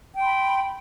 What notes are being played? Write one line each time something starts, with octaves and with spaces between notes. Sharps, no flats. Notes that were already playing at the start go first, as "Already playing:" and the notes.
G5 B5 C6